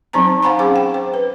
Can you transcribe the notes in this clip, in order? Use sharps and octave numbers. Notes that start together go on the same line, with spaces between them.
F#3 C4 D#4 C5 A5 A#5
C5 F5 F#5 G#5 A#5 B5
C#4 G#4 C5 F5 D6
G5
C5
B4